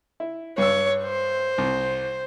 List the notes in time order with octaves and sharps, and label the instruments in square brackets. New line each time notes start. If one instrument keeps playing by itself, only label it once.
[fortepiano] E4
[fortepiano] G2 E6 [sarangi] C#5
[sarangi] C5
[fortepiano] C2